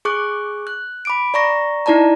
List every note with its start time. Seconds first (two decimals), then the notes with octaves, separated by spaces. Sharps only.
0.05 G#4 C#6 D6 F#6
0.67 F#6
1.05 B5 D6 D7
1.34 D5 A#5 C#6 A#6
1.86 D#4 E4 D5 A5 A#5